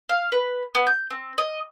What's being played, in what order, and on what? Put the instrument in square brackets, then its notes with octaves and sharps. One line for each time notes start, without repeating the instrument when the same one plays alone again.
[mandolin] F5
B4
B3
G6
C4
D#5